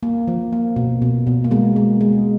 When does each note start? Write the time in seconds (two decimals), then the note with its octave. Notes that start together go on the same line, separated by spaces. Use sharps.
0.03 A#3
0.27 F3
0.53 A#3
0.76 B2
1.02 B2
1.27 B2
1.44 A#3
1.51 G#3 B3
1.76 G#3
2.01 G#3